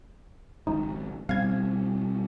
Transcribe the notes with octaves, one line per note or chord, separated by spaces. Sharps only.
G#1 C#2 D#4
B2 G3 C4 F5 G#6